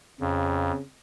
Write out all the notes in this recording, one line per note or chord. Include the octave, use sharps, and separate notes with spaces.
F2 C#3